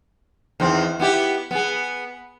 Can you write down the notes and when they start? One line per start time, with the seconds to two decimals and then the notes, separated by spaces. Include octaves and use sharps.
0.60 E2 D#3 C4
1.00 B3 E4 G4
1.51 B3 G#4